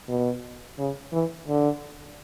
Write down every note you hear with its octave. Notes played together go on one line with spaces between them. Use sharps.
B2
C#3
E3
D3